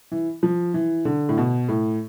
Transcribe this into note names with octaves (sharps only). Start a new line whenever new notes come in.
E3
F3
E3
D3
A2
B2
A2